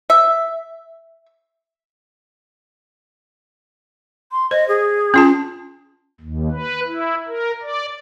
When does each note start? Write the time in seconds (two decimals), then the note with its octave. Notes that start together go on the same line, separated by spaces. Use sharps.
0.10 E5
4.32 C6
4.51 C5 D#5
4.68 G#4
5.14 C#4 F4 A5
6.21 D#2
6.51 B4
6.87 E4
7.27 A#4
7.63 D5